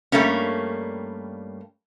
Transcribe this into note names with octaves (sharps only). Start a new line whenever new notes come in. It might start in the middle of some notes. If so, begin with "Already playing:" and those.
G2 G3 A3 A#3 C#4